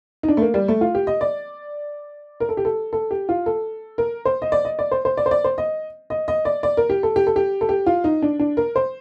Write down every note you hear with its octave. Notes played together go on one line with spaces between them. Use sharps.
D#4
D4
A3
A#3
G3
A3
F4
G4
D#5
D5
A#4
A4
G4
A4
A4
G4
F4
A4
A#4
C5
D#5
D5
D#5
D5
C5
C5
D5
C5
D5
C5
D#5
D#5
D#5
D5
D5
A#4
G4
A4
G4
A4
G4
A4
G4
F4
D#4
D4
D4
A#4
C5